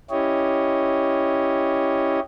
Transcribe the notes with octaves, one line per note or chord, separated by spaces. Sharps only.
C#4 E4 G4 C#5 D#5